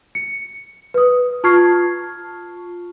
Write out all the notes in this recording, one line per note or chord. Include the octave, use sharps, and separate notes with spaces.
C#7
B4 D#6
F4 A5 C#6 F6 G#6 C7